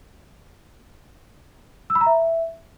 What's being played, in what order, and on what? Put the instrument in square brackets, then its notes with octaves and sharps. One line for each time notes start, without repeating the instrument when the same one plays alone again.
[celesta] E6
B5
A#5
E5